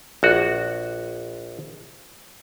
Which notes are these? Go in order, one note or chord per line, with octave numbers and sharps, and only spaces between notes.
A#1 F#4